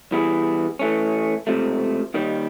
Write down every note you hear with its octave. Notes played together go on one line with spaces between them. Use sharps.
E3 G3 B3 E4 G#4
E3 A3 C#4
C#2 C3 F3 A3
D#2 D#3 G3